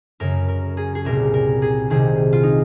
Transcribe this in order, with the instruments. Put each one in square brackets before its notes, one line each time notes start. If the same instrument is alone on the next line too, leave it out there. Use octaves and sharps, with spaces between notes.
[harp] F#2 C#3 A#4
A#4
G#4
G#4
C2 A#2 A#4
A#4
G#4
C2 C3 D#3 G#4
F4
D#4